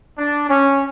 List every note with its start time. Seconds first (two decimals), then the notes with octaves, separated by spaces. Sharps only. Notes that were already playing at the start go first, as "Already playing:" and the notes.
0.18 D4
0.48 C#4